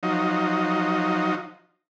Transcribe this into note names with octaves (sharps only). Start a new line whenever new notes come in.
F3 F#3 D#4